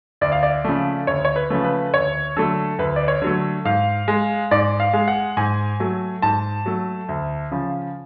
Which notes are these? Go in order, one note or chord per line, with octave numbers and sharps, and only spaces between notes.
D2 D5
F5
D5
C#3 F3 A3
D2 C#5
C#5
B4
C#3 F3 A3
B4
D2 C#5
D3 F#3 A3 A4
D2 B4
D5
C#5
D3 F#3 A3
G#2 F5
G#3
G#2 D5
F5
G#3
F#5
G#2 G#5
F#3 A3
G#2 A5
F#3 A3
D2
C#3 F3